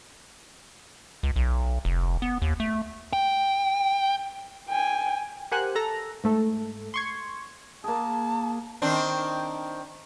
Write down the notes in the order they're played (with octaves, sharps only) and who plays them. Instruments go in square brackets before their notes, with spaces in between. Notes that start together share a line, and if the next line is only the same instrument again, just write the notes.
[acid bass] C#2
B1
F1
B3
D#2
A3
[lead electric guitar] G5
[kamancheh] G5 G#5
[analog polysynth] G4 A#4 C5 F#5 G#5 F#6
A4 A#5 A#6
G#2 A3 A4
C6 C#6 G#6
[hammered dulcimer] A#3 G#4 [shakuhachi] A5
[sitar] D#3 C4 D4